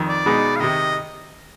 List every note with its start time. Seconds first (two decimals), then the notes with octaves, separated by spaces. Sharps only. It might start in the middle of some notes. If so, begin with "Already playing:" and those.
Already playing: F2 D#3
0.09 D5
0.26 B2 G#3 B3 D#4
0.56 F5
0.60 C3 D#3 D#5